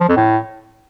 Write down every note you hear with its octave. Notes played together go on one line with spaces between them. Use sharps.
F3
F2
A2